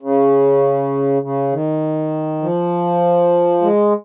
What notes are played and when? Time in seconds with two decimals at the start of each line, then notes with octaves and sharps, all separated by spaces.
0.02 C#3
1.22 C#3
1.52 D#3
2.42 F3
3.62 G#3